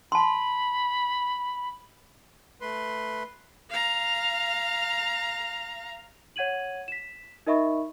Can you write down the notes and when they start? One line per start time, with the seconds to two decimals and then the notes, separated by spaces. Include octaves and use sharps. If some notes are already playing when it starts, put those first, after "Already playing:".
0.12 A5 B5 C6
2.61 A3 B4 C6
3.70 F5 A#5
6.36 C#5 F#5 G#6 D#7 F#7
6.88 B6 E7
7.47 D#4 A#4 D#5 E5 B5 C#6